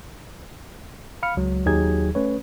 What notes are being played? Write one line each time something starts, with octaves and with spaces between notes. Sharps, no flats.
F5 B5 F6 C#7
C#2 F#3 G#3
D#2 F#3 D#4 G4 G#4 G#6
A3 C#4 B4 C#5